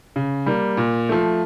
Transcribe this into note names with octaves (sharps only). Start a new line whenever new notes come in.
C#3
G3 A#3
A#2
F3 A3